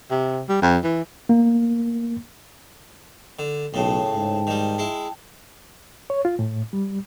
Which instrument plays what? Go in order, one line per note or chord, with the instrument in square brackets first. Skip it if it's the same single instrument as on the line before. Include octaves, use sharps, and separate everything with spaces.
[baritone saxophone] C3
G3
F2
E3
[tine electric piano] A#3
[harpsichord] D3
[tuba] B1 [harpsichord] A2 C#3 [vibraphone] G5 A5
[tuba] G#2
[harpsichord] D#3 G3
G#3 E4
[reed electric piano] C#5
F4
A2
G3